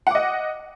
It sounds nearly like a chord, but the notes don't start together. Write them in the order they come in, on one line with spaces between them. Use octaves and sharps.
F#5 D6 D#5